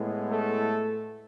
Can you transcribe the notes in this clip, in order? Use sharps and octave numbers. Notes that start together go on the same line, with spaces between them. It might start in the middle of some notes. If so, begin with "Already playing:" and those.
Already playing: A2 G#3 B3
A3 A4